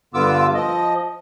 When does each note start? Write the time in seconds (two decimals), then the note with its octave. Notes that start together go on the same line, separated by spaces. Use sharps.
0.14 G2 D3 B3 F4 D6 E6
0.54 F3 D#5